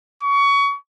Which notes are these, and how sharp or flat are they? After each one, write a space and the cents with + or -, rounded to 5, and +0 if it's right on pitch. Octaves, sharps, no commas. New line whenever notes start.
C#6 +25